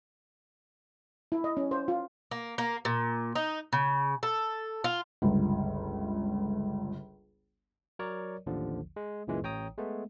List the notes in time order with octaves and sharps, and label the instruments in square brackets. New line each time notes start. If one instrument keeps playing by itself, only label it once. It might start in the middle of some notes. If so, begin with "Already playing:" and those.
[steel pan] E4
D#5
C#4
C5
F4
[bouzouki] A#3
A#3
A#2
D#4
C#3
A4
F4
[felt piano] G1 C#2
[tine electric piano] F#3 A#4 C#5 D5
A1 D#2 D3 F3
G#3
C#2 F#2 A#2 E3 G#3
A1 C#5 G5 A#5 D#6
G#3 A3 B3